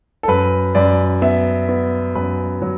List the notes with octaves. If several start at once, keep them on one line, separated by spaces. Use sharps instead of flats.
A4
F#2 B4
F#2 D5
B3 E5
B3
F#2 B4
F#3